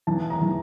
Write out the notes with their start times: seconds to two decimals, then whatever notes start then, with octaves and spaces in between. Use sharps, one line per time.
0.07 E3 A5
0.30 A#5
0.41 E3